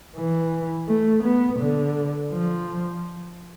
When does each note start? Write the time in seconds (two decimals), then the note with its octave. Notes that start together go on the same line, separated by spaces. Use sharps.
0.17 E3
0.88 A3
1.24 B3
1.60 D3
2.32 F3